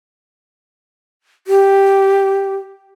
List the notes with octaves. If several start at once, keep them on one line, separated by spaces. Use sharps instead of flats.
G4